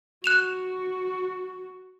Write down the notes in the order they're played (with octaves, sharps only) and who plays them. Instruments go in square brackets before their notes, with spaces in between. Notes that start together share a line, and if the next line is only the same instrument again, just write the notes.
[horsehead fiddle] F#4 [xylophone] F#6 E7 F7